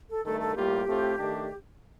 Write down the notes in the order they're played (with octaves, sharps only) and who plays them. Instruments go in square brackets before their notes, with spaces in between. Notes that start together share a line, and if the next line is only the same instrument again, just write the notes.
[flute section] A4
[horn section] G2 D#3 A3 [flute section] A4
[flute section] A4
[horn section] A2 G3 A#3 F4 [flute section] G4
[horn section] A2 A3 C4 F4
D#3 A3 D4